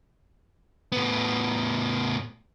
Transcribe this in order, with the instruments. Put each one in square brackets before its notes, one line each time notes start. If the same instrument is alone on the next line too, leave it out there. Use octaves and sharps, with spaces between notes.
[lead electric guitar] A2 B3